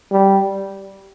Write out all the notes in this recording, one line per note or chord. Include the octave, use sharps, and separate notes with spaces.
G3